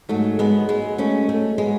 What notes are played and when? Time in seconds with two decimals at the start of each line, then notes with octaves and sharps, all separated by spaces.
0.09 G#2 F#3 A3
0.39 G#3 B3
0.69 G#3 B3
0.98 A3 C#4
1.29 A3
1.58 G#3 B3